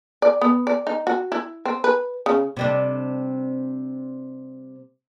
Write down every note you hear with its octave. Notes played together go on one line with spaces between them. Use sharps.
D5
B3
D5
D#4
F#4
E4
C4
B4
C#3
C3 G3 D4